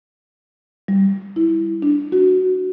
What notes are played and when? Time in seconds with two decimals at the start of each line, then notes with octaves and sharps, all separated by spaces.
0.88 G3
1.36 E4
1.82 D4
2.12 F#4